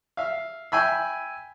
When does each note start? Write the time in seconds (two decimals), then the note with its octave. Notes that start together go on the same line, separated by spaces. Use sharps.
0.17 E5 F5
0.72 E5 G5 G#5 B5 E6